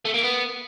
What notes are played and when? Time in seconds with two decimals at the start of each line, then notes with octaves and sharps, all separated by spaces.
0.05 A3
0.14 A#3
0.23 B3